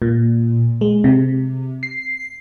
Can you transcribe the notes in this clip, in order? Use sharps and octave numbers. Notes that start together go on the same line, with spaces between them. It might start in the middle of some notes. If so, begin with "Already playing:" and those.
A#2
G#3
C3
C7